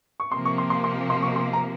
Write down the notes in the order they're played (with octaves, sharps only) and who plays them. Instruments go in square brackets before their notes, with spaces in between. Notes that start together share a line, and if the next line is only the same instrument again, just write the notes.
[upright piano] C#6
[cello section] C3 F3 A#3 [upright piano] C6
[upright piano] C#6
C6
C6
C6
C6
C#6
C6
A#5